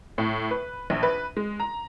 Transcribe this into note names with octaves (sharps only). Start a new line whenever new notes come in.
A2
B4
A#1
B4
G#3
A#5